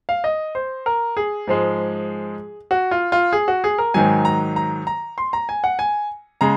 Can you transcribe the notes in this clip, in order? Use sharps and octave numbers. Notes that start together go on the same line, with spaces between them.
F5
D#5
C5
A#4
G#4
G#2 F3 G#3
F#4
F4
F4
G#4
F#4
G#4
A#4
G#2 D#3 F#3 G#5
A#5
A#5
A#5
C6
A#5
G#5
F#5
G#5
C#3 G#3 A#5